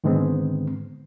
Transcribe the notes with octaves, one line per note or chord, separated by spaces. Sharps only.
G#2 D3 D#3 G#3 B3 C4